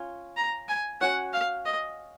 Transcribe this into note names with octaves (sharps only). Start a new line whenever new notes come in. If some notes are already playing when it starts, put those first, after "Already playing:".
Already playing: C#4 F4 C#5
A#5
G#5
C#4 F#4 C#5 F#5
F5
D#5